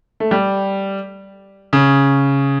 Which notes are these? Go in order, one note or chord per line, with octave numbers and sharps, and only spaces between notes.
A3
G3
C#3